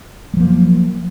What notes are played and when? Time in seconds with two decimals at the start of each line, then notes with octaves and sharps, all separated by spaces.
0.34 G#3
0.37 F3
0.40 A#3
0.43 F#3